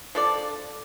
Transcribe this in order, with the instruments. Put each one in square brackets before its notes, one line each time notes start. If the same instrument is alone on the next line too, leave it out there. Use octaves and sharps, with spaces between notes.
[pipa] F3 D4 A4 D5